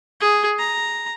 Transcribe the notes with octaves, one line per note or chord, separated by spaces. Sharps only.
G#4
A#5